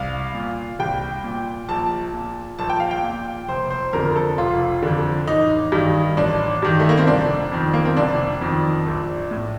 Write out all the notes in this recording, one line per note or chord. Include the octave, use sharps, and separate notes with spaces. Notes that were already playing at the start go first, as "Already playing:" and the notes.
Already playing: C2 F5
A#2
C2 G5
A#2
A#1 A5
A#2
A#1 A5
G5
F5
G5
A#2
F1 C5
C5
F2 D3 A#4
A4
F1 F4
F2 D3
A1 D#4
G2 D#3
A1 D4
G2 D#3
A3
A#3
C4
F1 D4
F2 D#3
A#3
C4
F1 D4
F2 D#3
A#1
A2